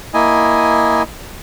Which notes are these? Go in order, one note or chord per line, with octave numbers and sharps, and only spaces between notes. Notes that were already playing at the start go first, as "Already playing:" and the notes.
A#3 E4 D#5 G#5